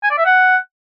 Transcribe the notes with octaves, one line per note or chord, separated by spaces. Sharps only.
G#5
D5
E5
F#5